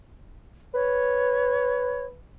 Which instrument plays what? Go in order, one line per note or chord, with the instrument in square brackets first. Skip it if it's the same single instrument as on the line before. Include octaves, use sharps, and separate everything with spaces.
[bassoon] B4 [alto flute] C#5